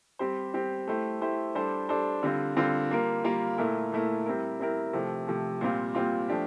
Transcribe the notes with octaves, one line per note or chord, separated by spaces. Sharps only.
G3 C4 G4 C5
G3 C4 G4 C5
A3 E4 G4 C5
A3 E4 G4 C5
G3 D4 A4 C5
G3 D4 A4 C5
D3 G3 C4 F4
D3 G3 C4 F4
G3 A#3 F4 A#4
G3 A#3 F4 A#4
A#2 A3 E4 A#4
A#2 A3 E4 A#4
G3 C4 E4 A#4
G3 C4 E4 A#4
C3 F3 A3
C3 F3 A3
A#2 G3 C4 F4
A#2 G3 C4 F4
F3 A3 D4 G4